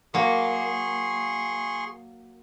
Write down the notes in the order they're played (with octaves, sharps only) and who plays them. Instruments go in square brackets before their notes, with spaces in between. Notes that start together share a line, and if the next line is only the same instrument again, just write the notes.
[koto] F#3 A#3 [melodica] G#4 C6 C#6